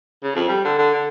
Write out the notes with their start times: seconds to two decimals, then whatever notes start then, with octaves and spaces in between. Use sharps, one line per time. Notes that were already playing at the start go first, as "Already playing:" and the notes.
0.23 C#3
0.35 F2
0.48 G3
0.65 D3
0.78 D3
0.94 D3